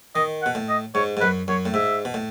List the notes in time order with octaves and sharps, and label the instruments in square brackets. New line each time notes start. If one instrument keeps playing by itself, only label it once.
[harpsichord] D#3 [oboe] D#5
[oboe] F#5
[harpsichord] B2
A2
[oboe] D#5
[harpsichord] G#2 [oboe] C#5
[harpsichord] G#2
[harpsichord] F#2 [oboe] B4
[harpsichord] F#2 [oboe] C#5
[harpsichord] A2
[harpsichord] G#2 [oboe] E5
[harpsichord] B2
A2